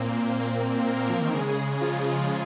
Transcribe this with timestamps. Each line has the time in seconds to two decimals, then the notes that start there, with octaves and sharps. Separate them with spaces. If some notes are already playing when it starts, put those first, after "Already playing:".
Already playing: A#2 A#3 C4
0.40 C4
0.88 A#3 A#4
1.10 F3
1.22 D#3
1.34 C#3 G#3 G#4
1.81 F3 F4